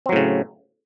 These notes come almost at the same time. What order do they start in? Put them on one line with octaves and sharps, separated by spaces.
C4 F#3 A2 C#3